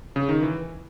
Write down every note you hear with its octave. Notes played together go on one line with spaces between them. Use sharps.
C#3
D#3
E3